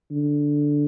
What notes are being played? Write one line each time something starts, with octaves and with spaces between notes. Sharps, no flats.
D3